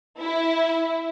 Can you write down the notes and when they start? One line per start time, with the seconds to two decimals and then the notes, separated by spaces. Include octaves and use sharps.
0.20 E4